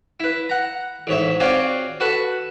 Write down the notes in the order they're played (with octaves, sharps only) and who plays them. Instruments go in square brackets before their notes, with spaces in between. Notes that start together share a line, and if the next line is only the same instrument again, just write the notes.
[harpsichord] E4 B4
F#5 A#5
A1 G#2 C#5 E5
C4 F4 F#4 G#4 C#5 D5
F#4 A4 B4 F#5